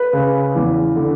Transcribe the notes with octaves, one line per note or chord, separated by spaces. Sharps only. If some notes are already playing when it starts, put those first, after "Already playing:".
Already playing: B4
C#3
E2
D3